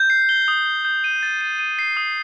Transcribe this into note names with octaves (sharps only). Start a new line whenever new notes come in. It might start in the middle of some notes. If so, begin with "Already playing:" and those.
Already playing: G6
C7
G7
D#6
G7
G6
D#7
A6
D#7
D#7
C7
D#6